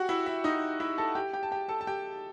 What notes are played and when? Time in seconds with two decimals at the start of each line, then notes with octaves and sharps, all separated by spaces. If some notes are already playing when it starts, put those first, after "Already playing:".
Already playing: F#4 G4 F#5
0.09 E4 E5
0.26 E4 E5
0.44 D#4 D#5
0.80 E4 E5
0.98 A4 A5
1.15 G4 G5
1.33 G4 G5
1.43 A5
1.51 G4 G5
1.68 A4 A5
1.81 A5
1.87 G4 G5